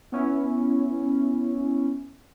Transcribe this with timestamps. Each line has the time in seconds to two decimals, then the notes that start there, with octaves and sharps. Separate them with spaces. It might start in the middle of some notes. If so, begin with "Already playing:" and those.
0.12 B3 C#4 E4